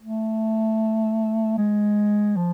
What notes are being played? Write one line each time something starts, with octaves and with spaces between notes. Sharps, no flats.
A3
G#3
F3